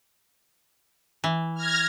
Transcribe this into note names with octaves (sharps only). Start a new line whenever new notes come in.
E3
F6 G#6 A#6